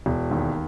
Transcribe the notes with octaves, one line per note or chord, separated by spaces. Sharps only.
E1
D#2